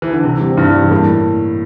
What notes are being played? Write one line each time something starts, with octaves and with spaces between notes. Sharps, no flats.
E3
D3
C3 E3
G3 C4
G2 E3
G3 C4
A2 A#3